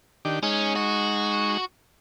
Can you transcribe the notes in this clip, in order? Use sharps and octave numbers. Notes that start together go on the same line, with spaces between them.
D#3 D4 G4
G#3 C#4 D#4
F#4